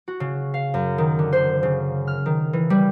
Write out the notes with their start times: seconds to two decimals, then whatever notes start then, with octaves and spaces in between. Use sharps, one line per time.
0.08 F#4
0.20 C#3
0.54 F5
0.74 F#2
0.98 D#3
1.19 D3
1.33 C5
1.63 C#3
2.08 F6
2.26 D#3
2.53 E3
2.70 G3